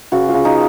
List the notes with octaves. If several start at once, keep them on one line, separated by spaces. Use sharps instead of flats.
C#3 F#4
F4
C#3
D#4